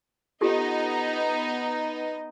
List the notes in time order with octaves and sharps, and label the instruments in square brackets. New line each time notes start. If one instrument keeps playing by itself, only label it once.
[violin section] B3 D#4 D#5 [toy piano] F4 G4 A4